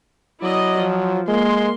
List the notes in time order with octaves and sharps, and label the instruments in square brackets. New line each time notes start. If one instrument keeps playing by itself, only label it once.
[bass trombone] F#3 [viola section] E4 D5 D#5
[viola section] F3
[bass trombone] G#3 [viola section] A#3 C6